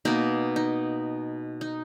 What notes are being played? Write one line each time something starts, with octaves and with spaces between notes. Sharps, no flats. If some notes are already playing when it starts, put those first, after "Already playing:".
B2 A#3 D#4
D#4
D#4